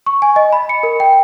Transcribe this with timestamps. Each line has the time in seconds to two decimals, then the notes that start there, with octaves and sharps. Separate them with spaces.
0.06 C#6
0.22 G#5
0.36 D#5
0.52 B5
0.69 C#7
0.83 A#4
1.00 G5